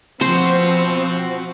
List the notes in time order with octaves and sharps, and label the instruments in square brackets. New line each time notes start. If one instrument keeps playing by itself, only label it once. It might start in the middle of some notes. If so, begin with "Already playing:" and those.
[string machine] F3 [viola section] C4 [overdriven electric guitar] F#4 B4 [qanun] C5